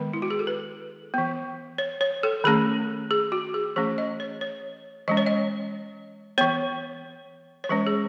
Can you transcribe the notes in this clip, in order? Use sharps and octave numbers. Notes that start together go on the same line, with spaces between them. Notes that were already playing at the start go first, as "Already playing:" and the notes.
Already playing: D#3 G#3 B3 B4
E4
F#4
G#4
A4
B4
E3 B3
C#5
C#5
A4
D#3 A3 C#4 G#4
G#4
F#4
G#4
E3 A3 C#4 G#4
D#5
C#5
C#5
E3 G#3 C#4 D#5
C#5
D#5
E3 B3 C#5
C#5
E3 G#3 C#4 B4
G#4